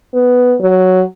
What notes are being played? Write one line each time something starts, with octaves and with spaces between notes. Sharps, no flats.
B3
F#3